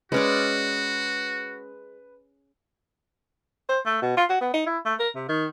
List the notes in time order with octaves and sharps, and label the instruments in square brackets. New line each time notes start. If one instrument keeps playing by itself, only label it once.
[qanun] G#3 C#4 D5 [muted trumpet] F#4 [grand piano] B4
[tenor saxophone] C5
A3
B2
F4
F#4
B3
D#4
E4
A3
A#4
C3
D#3